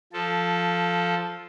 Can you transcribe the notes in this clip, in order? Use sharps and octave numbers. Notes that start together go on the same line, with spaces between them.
F3 A4